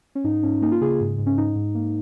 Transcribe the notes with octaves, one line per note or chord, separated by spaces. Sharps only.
C#4
G#2 D#4
G#2 C#4
A#3 D#4
F4
C#3 G#4
G#2
G#2
C#4
G#2 D#4
G#2
A#3